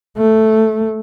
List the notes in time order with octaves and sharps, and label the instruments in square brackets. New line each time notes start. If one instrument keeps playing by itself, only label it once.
[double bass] A3